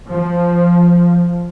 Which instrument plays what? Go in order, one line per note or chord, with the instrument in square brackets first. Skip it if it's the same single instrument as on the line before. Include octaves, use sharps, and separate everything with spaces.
[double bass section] F3